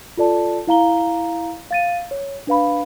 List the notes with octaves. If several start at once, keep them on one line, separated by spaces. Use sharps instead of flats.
F4 A4 D5 A5
E4 F5 A#5 G7
F5 A6 D#7
C#5
D4 B4 F5 B5